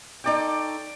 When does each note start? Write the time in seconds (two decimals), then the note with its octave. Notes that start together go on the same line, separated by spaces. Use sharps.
0.24 D#4 A4 C#5 D5 G5